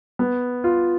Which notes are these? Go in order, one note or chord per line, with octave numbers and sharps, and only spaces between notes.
B3
F4